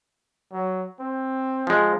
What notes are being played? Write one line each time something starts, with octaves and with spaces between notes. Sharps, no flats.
F#3
C4
F3 G#3